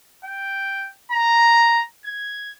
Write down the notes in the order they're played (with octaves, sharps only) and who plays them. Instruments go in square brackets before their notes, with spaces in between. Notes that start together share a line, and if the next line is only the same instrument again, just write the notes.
[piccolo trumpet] G5
A#5
G#6